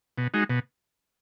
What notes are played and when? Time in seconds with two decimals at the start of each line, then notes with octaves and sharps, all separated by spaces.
0.18 B2
0.34 G#3 D#4 F#4
0.50 B2